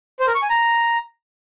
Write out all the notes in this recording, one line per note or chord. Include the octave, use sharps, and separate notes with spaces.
C5
A#4
C#6
G#5
A#5